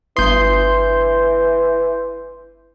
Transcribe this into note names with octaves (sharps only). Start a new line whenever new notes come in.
G1 E3 C6 D#6 G6